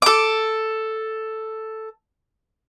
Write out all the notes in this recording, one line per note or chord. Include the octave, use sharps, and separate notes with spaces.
A4 D6